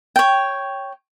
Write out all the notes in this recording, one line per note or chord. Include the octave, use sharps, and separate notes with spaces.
C#5 G5